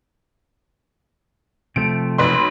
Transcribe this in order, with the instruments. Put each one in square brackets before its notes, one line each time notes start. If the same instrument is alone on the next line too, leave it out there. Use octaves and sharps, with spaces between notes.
[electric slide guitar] C3 F3 A3 [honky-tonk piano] D7
[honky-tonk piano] B1 B4 C6